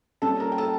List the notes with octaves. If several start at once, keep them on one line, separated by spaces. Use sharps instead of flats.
A#2 G3 C#4 A4 A5
A#4 A#5
G5
A4 A5